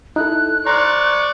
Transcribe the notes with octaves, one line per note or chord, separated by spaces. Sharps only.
D#4 E4 A4 F#6
D5 A#5 C6 C#6 F6